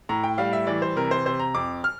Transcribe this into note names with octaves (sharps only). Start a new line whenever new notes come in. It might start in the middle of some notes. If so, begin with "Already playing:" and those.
A2 A#5
G5
G3 F5
E5
E3 D5
C5
C3 A#4
C5
C3 C5
A#5
F2 D6
F6